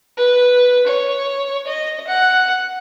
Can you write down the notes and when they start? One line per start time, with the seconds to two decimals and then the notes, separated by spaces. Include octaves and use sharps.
0.17 B4
0.87 C#5
1.67 D#5
2.08 F#5